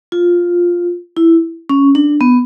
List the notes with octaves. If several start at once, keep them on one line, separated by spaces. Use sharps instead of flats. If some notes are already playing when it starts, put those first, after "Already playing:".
F4
E4
C#4
D4
B3